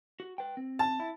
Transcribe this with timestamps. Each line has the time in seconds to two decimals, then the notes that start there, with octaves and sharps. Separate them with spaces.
0.20 F#4
0.38 B4 G5
0.57 C4
0.79 A5
1.00 E4